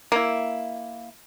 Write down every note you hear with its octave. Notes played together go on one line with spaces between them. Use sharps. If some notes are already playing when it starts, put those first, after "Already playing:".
A#3 E4